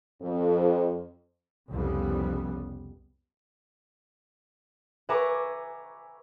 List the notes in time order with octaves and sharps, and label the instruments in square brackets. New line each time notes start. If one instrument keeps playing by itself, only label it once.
[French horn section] F2
[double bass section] C2 F2 C#3 G3 B3
[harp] B4 E5 G#5 A#5 C#6 D6